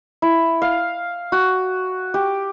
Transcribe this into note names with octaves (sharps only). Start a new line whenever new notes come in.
E4
F5
F#4
G4